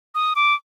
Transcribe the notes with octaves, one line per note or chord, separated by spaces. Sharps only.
D#6
D6